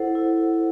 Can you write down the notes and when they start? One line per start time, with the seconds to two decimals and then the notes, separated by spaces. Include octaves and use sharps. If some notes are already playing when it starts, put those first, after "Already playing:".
Already playing: E4 A4 C5 F#5
0.15 E4